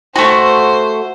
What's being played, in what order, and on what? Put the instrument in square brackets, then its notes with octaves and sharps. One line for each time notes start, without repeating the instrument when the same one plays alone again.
[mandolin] A3 F#4 [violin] C5